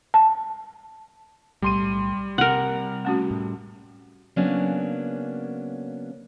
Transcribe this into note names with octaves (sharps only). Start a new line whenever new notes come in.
A5
B1 A2 G3 C6 D#7
C3 A#4 F#5
A3 C#4 F#4
A2
C#3 F#3 A#3 B3 C#4 D4